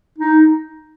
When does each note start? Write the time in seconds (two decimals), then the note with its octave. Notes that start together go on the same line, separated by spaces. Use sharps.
0.18 D#4